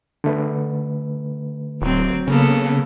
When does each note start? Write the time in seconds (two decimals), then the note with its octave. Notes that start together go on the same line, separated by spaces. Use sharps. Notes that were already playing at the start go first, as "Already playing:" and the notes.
0.24 D3 A3 B4
1.82 D1 F#3 C4
2.27 C#3 A#3 B3 A4